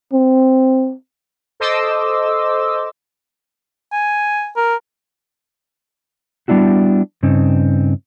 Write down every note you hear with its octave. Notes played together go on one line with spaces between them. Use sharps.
C4
A4 C5 D#5 C6 D6 E6
G#5
A#4
G3 B3 D4 E4 F#4
G2 C#3 C4 D#4